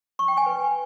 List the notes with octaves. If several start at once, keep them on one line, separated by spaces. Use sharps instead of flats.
C#6
G5
G#5
B4